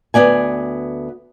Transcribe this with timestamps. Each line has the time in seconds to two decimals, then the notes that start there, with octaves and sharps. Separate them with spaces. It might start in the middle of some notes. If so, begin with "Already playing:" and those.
0.14 D2 C#3 B3 D5 G#5